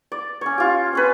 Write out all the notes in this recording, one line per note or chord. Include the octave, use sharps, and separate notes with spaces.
D5
C#4 C#5
F4 G4
C4 C#4 B4